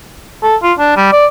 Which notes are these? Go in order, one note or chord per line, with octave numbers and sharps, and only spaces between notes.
A4
F4
D4
G3
D5